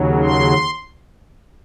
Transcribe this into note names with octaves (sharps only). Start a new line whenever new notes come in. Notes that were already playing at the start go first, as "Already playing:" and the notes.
Already playing: D#2 C#3 F#3
C6